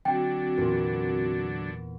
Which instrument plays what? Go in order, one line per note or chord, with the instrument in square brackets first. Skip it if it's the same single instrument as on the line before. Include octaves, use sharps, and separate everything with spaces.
[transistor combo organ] D3 F#3 D4 [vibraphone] C4 F#4 [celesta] G5
[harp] E2 A#2